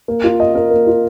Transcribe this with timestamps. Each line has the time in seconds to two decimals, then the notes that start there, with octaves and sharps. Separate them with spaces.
0.08 A#3
0.24 F4
0.40 D#5
0.55 A#4
0.71 A#3
0.87 F4